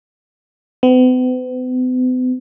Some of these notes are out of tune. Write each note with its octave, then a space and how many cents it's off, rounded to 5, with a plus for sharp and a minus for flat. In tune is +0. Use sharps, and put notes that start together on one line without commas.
B3 +45